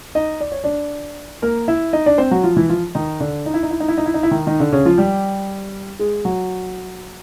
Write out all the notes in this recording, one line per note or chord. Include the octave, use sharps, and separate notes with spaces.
D#4 D#5
D5
C#5
D4 D5
A#3 A#4
E4 E5
D#4 D#5
D4 D5
C4 C5
F#3 F#4
F3 F4
E3 E4
F3 F4
D#3 D#4
D3 D4
D#4
E4
D#4
E4
D#4
E4
D#4
E4
D#4
E4
D#3 D#4
D#3 D#4
D3 D4
C#3 C#4
F3 F4
G3 G4
G#3 G#4
F#3 F#4